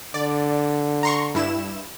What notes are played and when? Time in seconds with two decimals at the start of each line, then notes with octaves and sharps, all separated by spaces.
0.14 D3 D5
1.03 A#5 C6 C#6
1.35 G2 E4 E7